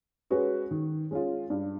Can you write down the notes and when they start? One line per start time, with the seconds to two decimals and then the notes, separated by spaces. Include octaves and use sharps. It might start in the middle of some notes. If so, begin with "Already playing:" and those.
0.31 G#3 C#4 F#4 B4
0.71 D#3
1.11 G#3 C#4 F4
1.50 G2